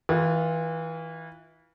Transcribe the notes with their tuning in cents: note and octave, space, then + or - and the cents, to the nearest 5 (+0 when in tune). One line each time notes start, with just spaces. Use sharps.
E3 -25 F4 +0